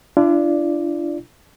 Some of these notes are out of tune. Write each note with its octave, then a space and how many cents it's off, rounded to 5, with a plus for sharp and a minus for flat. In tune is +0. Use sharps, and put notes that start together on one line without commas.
D4 +0 F4 -45 D5 +0